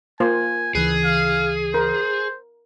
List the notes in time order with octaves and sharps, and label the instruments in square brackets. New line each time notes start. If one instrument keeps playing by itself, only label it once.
[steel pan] A#3 F4 C5 [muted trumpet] G#5
[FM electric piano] D2 C#3 E3 [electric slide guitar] G#4 [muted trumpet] B4
[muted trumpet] F5
[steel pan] A#4 [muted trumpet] C5